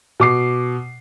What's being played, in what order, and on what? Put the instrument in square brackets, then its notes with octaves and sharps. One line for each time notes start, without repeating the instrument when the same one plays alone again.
[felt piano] B2 D6 C7